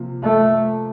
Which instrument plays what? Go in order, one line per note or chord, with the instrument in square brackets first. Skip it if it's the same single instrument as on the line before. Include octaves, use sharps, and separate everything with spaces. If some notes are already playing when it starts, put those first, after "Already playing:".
Already playing: [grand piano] C3 F3 A#3
[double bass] A3